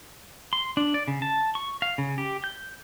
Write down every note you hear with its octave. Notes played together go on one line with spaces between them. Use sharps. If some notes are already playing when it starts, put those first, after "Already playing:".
C6
D4
D5
C#3
A5
C#6
F5
C#3
G4
G6